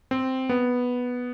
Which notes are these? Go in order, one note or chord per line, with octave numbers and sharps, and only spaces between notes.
C4
B3